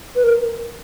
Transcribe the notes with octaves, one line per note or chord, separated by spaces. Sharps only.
B4
A#4